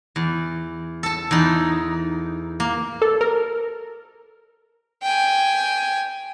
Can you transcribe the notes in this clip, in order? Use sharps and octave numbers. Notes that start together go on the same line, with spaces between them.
E2
A4 A5
E2 D#4
A#3
A4
A#4
G5 G#5